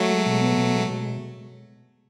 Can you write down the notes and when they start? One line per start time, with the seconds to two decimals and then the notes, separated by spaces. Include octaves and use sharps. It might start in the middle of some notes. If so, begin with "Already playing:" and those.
Already playing: F#3 A3
0.10 G#3
0.26 B2
0.41 B3
0.58 B2
0.75 G#3
0.90 B2